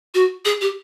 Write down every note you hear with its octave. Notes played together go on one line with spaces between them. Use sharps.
F#4
G#4
G4